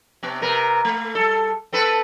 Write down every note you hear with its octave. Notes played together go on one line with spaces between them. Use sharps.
C3 B3
C3 A#4 B4
A3
G3 A4
C4 A4 B4